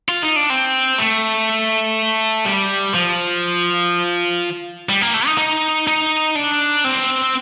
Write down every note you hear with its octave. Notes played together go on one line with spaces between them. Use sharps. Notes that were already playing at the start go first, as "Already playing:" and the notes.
F4
D#4
D4
C4
A3
G3
F3
G3
A#3
A3
D#4
D#4
D#4
D4
C4